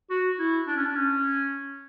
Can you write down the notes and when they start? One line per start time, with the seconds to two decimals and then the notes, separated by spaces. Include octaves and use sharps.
0.10 F#4
0.39 E4
0.67 D4
0.76 C#4
0.84 D4
0.95 C#4